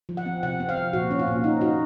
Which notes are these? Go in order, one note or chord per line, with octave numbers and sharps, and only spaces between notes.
F3
F#5
C4
C3 F#5
C4
F5
F3
A#2 F#4
C#4
F4
A#2
D#4
D#4 F#4